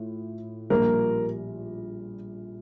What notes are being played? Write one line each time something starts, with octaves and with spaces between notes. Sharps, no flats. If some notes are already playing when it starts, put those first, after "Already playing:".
Already playing: A2 F4
A#1 A#2 G3 A#4